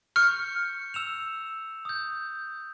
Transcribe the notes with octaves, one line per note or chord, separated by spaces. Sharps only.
C#6 F6 G6 C#7
E6 E7 F7
D#6 G6